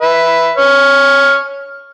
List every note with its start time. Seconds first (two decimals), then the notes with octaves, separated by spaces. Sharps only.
0.01 B4 E5
0.57 C#5 F6